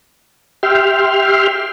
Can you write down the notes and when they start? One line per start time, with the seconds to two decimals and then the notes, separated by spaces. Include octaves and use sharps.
0.63 G4 E5 G5 C6 F6